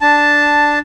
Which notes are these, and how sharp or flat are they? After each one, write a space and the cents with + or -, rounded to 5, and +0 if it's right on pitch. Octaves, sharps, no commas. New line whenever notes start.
D4 +0 A5 +0